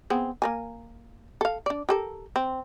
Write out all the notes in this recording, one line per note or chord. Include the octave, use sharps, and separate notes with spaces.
B3 C4 G#4
A#3 A#4 G#5
A4 F5
D4 D5
G4 A4 A#4
C4